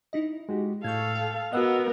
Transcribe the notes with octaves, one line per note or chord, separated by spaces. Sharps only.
D#4 E4 D#5
G#3 F#4 G4
A2 A4 F5 C#6 G6 G#6
G5
B3 F#4 A#4 D#5 F#5 E6 F#6